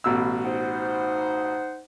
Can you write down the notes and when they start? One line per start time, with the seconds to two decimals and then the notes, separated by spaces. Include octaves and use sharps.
0.04 A1 B2 E6
0.44 D#4 C5 F#5